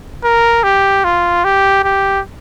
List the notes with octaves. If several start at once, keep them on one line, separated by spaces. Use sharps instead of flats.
A#4
G4
F4
G4
G4